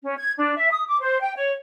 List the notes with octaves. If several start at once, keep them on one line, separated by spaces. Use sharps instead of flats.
C#4
G#6
D4
E5
D#6
D6
C5
G5
C#5